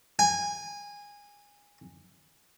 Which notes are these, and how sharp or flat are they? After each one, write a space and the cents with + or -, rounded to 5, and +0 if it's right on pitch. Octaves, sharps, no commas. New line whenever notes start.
G#5 -20